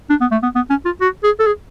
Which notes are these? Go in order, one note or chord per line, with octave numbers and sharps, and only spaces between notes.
D4
B3
A3
B3
B3
C#4
F4
F#4
G#4
A4
G#4